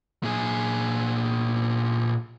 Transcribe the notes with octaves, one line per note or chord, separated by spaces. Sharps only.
A#2 G#4